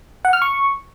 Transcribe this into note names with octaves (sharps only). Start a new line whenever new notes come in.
F#5
F6
C#6